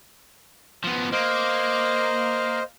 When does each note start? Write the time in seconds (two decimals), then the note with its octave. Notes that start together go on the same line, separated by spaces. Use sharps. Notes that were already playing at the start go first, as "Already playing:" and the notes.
0.84 F3 B3
1.12 A#3 C5 D#5